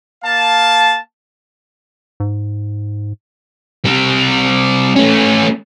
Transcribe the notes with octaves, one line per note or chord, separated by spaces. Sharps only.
A#3 F5 A5
G#2
G3 C4
A3 C#4